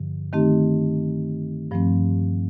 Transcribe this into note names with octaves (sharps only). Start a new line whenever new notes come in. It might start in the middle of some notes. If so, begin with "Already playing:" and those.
Already playing: G2 D3 F3
D#3 A3 C4 D#4 G4
G2 F3 A3 C4